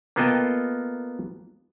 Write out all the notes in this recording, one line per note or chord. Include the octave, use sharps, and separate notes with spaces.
A#3 B3 F4 A4 D#5 G5